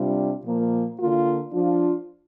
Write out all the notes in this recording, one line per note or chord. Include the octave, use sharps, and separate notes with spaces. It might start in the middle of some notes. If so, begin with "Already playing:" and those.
Already playing: C3 G3 D4 F4
A#2 F3 A#3
D3 A#3 F4
F3 D4 F4